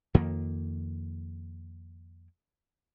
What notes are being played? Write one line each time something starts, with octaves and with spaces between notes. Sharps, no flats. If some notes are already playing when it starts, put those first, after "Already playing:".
F2 D#3 A#3